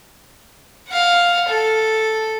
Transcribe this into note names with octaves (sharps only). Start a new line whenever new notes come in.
F5 F#5
A4